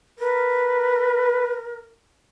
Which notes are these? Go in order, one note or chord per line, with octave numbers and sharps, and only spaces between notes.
A#4 B4